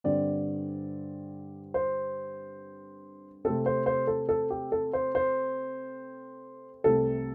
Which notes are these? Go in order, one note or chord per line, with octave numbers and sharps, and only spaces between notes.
G2 D3 C4 D5
C5
C3 A3 C4 A4
C5
C5
A4
A4
G4
A4
C5
C5
C2 C3 A3 C4 A4